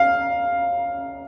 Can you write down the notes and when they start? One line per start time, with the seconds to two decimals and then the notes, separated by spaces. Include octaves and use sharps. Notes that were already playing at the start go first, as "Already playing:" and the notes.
Already playing: F5